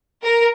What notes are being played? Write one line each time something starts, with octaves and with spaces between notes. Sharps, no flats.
A#4